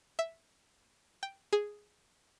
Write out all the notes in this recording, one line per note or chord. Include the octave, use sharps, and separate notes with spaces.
E5
G5
G#4